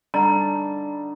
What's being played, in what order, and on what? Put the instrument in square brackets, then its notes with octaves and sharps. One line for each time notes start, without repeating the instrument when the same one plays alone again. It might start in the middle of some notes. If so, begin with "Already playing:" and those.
[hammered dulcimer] D3 D#4 [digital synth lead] G3 [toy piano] A#5